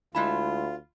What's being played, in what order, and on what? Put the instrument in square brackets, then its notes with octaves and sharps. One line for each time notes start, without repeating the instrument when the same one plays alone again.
[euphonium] D2 [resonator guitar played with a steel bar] G#3 E4 A5 [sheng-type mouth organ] F4 [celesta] B5